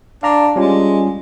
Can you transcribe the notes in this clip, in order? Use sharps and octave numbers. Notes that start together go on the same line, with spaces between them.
D4 F5 A#5
G3 G#3 C#4 F4